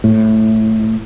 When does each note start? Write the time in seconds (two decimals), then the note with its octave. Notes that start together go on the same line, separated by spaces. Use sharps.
0.04 A2